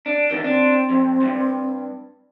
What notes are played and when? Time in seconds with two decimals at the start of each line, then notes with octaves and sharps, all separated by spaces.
0.06 D4
0.31 E2 D#3
0.44 C4 D4
0.90 F2
1.21 E2 G2